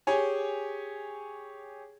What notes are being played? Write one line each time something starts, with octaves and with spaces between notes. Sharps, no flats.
G4 G#4 C#5 G#5